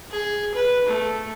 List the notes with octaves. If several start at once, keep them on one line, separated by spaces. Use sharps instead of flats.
G#4
B4
A3